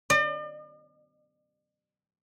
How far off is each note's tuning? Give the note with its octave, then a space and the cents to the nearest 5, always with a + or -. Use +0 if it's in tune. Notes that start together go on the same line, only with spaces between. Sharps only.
D5 +45